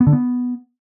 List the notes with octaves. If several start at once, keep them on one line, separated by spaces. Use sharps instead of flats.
B3
D3
B3